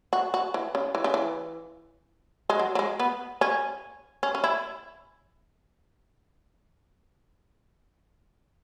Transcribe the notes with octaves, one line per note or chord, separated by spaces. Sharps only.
F#4
F#4
E3
C#3
E3
C#3
E3
G#3
F#3
F#3
G#3
B3
C#4
C#4
C#4
E4